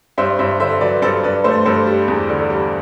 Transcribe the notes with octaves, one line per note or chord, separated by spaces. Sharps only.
G2 C5 E5
G2 C5 E5
D3 C5 E5
F#3 B4 D5
G2 A4 C5
G2 B4 D5
A3 A4 C5
G2 A4 C5
G3
E2
D3
G3